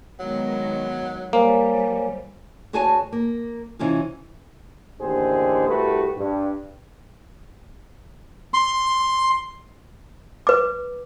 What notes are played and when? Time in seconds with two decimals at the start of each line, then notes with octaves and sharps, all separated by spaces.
0.20 D#3 F#3 G#3 B3
1.33 G3 A#3 C5 C#5 G#5
2.73 D2 F#4 G#4 C#5 G#5 A5
3.12 A#3
3.79 C3 E3 C#4 D#4 F4
5.01 A1 D#2 D3 G4 G#4 C5
5.68 C2 A3 F#4 G4 B4
6.16 G2
8.54 C6
10.47 B4 D6